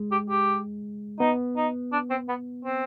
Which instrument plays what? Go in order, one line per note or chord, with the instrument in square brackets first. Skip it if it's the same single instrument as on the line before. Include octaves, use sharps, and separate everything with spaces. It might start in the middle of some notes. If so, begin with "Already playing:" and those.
Already playing: [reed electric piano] G#3
[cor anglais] G4
G4
[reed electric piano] B3 [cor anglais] D#4
[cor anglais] D#4
D4
C4
B3
C4